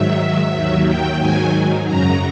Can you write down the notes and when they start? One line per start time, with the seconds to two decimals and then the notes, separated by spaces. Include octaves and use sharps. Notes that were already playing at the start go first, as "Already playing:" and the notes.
Already playing: G#2 D#3 F#3 E5
0.52 D#2 D#3 F#3
0.86 G5
1.19 G#2 D#3 F#3 G#5
1.85 F#2 C#3 F#3 A#5